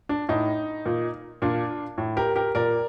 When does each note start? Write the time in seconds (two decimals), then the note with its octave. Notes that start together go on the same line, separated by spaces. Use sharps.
0.09 D4
0.29 A2 D#4
0.86 A#2
1.42 A#2 D4 F4
1.98 A2
2.17 G4 A#4
2.36 G4 A#4
2.55 A#2 A#4 D5